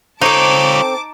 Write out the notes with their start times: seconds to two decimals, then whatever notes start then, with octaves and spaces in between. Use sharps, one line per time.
0.21 C4 D#4 F4 A4 C#5 A5 D6